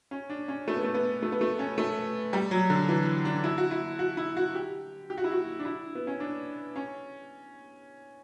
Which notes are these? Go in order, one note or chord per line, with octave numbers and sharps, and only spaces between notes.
C#4
D4
C#4
A3
B3
A3
B3
A3
B3
A3
C#4
A3
G3
F#3
D3
E3
D4
E4
F#4
E4
F#4
E4
F#4
G4
G4
F#4
E4
F#4
D4
E4
B3
C#4
D4
C#4